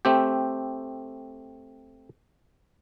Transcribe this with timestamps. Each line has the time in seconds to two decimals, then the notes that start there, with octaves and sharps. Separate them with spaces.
0.05 A3 C4 G4